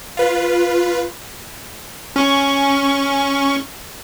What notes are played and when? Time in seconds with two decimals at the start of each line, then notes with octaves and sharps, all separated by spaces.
0.17 F4 B4
2.16 C#4 C#6